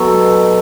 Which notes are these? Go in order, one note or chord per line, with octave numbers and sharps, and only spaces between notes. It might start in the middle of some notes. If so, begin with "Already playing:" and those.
Already playing: B2 F#3 A4